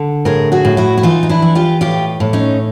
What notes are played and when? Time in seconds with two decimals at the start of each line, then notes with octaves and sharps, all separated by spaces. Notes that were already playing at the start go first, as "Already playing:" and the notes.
Already playing: D3
0.25 A2 G#4 A#4
0.52 F#4 G#4
0.65 A2
0.77 E4 F#4
0.97 E4
1.03 E3 D#4 F4
1.23 D#4
1.29 D4 E4
1.42 E3
1.55 F4 G4
1.81 A2 F4 G4
2.20 A2
2.33 C#4 D#4